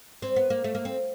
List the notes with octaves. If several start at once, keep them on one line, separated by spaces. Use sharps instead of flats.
C4
B3
A#3
A3
A#3
C4